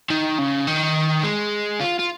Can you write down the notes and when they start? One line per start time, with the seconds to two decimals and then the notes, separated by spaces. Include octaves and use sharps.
0.10 D#3
0.39 C#3
0.67 D#3
1.24 G#3
1.80 F4
1.99 F4